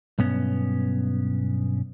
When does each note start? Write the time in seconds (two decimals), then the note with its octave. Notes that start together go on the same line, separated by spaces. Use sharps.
0.19 B1 G2 B3 C#4